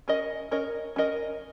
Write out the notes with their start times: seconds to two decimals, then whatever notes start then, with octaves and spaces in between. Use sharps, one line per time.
0.08 C#4 A#4 D#5
0.51 C#4 A#4 D#5
0.96 C#4 A#4 D#5